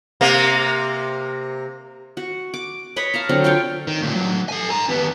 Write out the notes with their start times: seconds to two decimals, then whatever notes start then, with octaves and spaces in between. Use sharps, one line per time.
0.21 C3 A#3
2.17 F#4
2.54 D6
2.96 B4 C#5 D#5 B5
3.14 F5 A5 A#5
3.29 D3 F#3 C4
3.44 F4 C#5 F5 G5
3.87 D#3
4.01 D2 A#2
4.15 A2 F#3
4.49 A4 G#5
4.70 G#5 A#5
4.89 D#2 B3